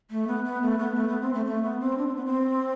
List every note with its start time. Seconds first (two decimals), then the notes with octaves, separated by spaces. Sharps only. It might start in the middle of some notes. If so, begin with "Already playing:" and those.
0.11 A3
0.27 B3
0.45 B3
0.62 A3
0.78 B3
0.95 A3
1.08 B3
1.21 C4
1.34 A3
1.46 A3
1.63 B3
1.80 C4
1.98 D4
2.07 C4
2.16 B3
2.26 C4